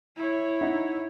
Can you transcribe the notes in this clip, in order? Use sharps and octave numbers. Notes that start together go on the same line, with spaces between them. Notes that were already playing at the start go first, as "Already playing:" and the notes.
E4 C#5
D#4 E5 F#5